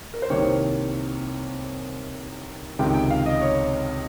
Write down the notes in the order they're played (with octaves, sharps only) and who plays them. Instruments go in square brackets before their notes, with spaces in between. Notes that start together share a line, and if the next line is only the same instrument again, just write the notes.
[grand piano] A#4
C5
C2 C3 D#3 A#3 C#5
C#2 C3 D#3 G5
G5
F5
D#5
C#5